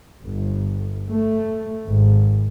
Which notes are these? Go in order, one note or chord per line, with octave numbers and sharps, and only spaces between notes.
G1
A3
G#1